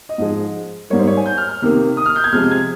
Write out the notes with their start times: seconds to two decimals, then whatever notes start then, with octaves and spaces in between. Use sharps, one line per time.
0.09 D#5
0.18 G#2 F3 G#3
0.90 G#2 G3 A#3 C#5
0.99 C5
1.07 C#5
1.17 G#5
1.26 G6
1.38 F6
1.49 F6
1.62 C3 D#3 A#3
1.97 D#6
2.06 F6
2.16 G6
2.24 G#6
2.32 C3 F3 G#3 F6
2.51 G#6